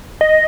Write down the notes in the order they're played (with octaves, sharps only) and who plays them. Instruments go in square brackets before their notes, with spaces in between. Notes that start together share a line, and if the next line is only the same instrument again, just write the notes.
[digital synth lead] D#5